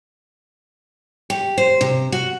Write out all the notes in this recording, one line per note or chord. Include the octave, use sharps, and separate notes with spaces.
G4
C5
C3
F#4